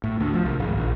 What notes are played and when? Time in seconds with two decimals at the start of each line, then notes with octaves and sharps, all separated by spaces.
0.04 A2
0.20 D2
0.34 F3
0.45 C2
0.60 G#1
0.75 A#1